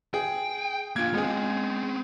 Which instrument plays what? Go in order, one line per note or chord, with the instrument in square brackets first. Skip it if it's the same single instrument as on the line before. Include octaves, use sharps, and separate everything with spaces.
[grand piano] G#4 [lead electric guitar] G5
[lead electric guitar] A#3 D4 [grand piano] F4 G#6
[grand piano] G#3 G#4 [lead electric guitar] B3 C4